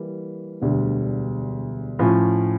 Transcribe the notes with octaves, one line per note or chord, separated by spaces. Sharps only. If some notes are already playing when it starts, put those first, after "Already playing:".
Already playing: E3 G3 A#3
E1 D2 D3 G3
A2 F3 C#4